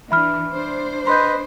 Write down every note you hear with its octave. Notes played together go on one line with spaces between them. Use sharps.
E3 D4 E5 B5 F6
D4 C5
B4 D#5 C6 G6